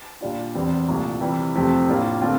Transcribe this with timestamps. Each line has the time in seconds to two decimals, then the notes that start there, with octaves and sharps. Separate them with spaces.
0.21 A#2 G3 D4 F4
0.55 E2 E3 G3 C4
0.88 C2 A#2 A3
1.21 C3 E3 G3
1.55 F2 C3 F3 A3 C4
1.88 A2 G3 A#3 D4 F4
2.22 D3 A3 C4 F4